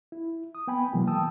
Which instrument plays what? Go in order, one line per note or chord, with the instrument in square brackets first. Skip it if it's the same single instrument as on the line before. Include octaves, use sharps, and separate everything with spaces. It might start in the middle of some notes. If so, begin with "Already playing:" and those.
[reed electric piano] E4
D#6
B3 G5 G#5 B5
B2 E3 F#3 G#3 A#3 B3
G5 A5 D#6 E6